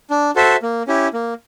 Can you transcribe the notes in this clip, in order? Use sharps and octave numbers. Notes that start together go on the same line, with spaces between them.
D4
F#4 A4 C5 E5
A#3
C#4 E4 G4
A#3